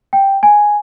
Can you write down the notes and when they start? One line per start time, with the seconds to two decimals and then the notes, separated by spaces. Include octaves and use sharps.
0.13 G5
0.43 G#5